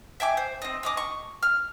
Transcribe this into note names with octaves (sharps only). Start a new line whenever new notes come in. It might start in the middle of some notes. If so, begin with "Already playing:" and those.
E5 G5 G#5 D6
C5
C4 D#5
C#4 D#5 D6
C#6
F6